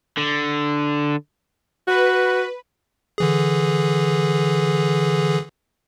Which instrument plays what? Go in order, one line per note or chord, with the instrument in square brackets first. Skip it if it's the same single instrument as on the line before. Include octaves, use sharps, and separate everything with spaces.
[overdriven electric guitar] D3
[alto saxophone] F#4 [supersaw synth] B4
[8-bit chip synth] D3 E3 G#4